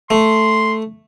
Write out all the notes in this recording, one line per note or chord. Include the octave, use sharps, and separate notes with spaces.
A3 C6